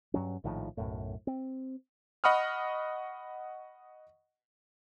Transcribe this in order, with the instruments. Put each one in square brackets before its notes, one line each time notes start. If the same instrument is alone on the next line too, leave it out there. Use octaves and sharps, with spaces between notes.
[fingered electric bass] G2 F#3 C#4
A#1 A2 D#3 F3
B1 F#2 A2
C4
[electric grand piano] D#5 F#5 B5 C#6 D#6 F6